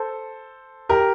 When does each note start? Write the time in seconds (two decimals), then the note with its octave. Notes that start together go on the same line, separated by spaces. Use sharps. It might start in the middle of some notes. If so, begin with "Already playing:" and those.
Already playing: A4 C5
0.89 G4 A#4